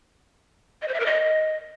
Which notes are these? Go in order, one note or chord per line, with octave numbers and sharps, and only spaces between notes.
D#5
C5
E5
A#4
D#5